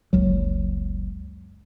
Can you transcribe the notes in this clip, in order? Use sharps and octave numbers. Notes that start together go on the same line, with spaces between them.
F#1 C#2 F#3